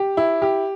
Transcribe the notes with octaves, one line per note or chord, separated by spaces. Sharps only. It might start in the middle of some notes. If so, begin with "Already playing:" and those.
Already playing: G4
E4
G4